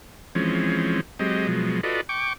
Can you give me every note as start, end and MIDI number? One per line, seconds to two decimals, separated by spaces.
0.35 1.01 52
0.35 1.01 53
0.35 1.01 56
0.35 1.01 60
0.35 1.01 61
1.19 1.47 54
1.19 1.47 56
1.19 1.47 60
1.19 1.47 67
1.19 1.47 75
1.47 1.81 47
1.47 1.81 53
1.47 1.81 54
1.47 1.81 56
1.83 2.01 65
1.83 2.01 66
1.83 2.01 69
1.83 2.01 71
1.83 2.01 74
1.83 2.01 75
2.09 2.33 79
2.09 2.33 85
2.09 2.33 86